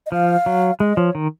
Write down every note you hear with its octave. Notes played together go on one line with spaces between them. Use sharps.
D#5
F3 F5
F#3
G#3 D#5
F3 C#5
D#3